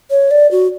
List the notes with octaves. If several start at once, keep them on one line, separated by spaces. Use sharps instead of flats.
C#5
D5
F#4